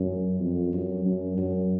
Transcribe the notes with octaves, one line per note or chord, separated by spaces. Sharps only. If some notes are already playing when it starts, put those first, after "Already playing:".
Already playing: F#2
F2
F#2
F#2
F#2